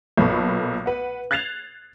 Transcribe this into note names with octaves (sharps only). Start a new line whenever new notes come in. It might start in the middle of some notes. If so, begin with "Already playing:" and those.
B1 A#2 B3 A4 B5 C#6
B4 F#5
F#6 G#6 A6 C7 E7 F7